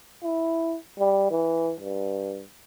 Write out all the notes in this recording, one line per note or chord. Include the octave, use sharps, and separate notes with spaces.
E4
G3
E3
G2